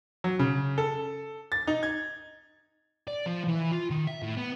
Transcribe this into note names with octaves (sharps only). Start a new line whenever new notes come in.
F#3
C#3
A4
A6
D#4
G#6
D5
F3
E3
F4
D#3
E5
A2
B3